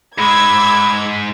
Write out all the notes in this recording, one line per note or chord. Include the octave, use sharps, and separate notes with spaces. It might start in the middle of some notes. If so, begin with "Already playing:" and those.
G#2 G#3 B5 D6 E6 G#6